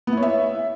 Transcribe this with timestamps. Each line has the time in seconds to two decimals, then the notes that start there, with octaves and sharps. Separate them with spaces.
0.07 B3
0.12 E4
0.17 C#5
0.23 E5